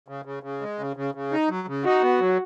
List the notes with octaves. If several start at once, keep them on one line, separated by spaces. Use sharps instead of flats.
C#3
C#3
C#3
G#3
C#3
C#3
C#3
D#4
F#3
C#3
D#4 F#4
B3
F#3